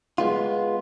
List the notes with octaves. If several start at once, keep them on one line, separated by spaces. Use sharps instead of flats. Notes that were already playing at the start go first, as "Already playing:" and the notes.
G#3 B3 F4